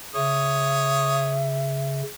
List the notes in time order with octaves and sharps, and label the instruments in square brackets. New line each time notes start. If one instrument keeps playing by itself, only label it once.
[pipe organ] C#3 [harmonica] C#5 D#6 [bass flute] E5